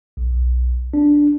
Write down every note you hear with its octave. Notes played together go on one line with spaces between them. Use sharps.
B1
D4